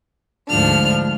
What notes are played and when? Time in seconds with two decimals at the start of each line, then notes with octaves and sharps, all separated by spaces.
0.48 D2 G#2 F3 D4 F6